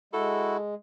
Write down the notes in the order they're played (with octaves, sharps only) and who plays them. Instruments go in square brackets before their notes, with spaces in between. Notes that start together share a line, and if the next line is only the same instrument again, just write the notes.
[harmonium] G#3 [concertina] E4 F#4 [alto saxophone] A4